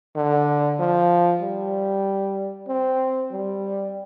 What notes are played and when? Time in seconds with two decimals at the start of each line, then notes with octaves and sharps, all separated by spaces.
0.16 D3
0.79 F3
1.42 G3
2.68 C4
3.32 G3